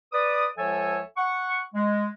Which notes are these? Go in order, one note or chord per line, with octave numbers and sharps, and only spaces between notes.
B4 D5 D#6
C#2 F3 A4 C#5 E5 G#5
F#5 C#6
G#3